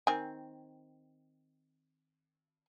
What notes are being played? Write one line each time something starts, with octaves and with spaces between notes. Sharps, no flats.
D#3 C4 G#5